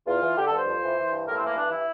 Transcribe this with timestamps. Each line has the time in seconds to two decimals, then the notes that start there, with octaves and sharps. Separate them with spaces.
0.07 E2 F4
0.22 E3
0.37 D3 G4
0.47 A4
0.52 G2
0.57 C5
0.67 F2
0.82 E3
0.97 E3
1.12 G2
1.27 A2 A#4
1.37 C4
1.42 E3 A#3
1.56 G2 D4
1.71 E3 E4